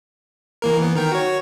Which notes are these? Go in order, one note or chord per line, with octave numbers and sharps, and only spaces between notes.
E3 A#3 A#4
E3 B3
D#3 A#4 G5
F#4 C#5